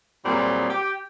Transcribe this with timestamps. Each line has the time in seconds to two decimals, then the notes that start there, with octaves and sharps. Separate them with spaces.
0.25 A#2 F#3 G3 C4 F4 G#4
0.69 G4 G5